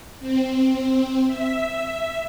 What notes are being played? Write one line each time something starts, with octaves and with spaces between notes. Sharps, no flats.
C4
E5